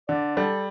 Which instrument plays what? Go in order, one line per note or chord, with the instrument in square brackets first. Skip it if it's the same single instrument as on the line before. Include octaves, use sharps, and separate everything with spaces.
[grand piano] D3 [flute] D5
[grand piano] G3 [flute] A4